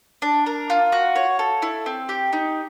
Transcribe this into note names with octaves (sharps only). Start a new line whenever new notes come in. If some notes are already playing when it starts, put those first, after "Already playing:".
D4
A#4
F4
F#4
C#5
A4
E4
C4
G4
D#4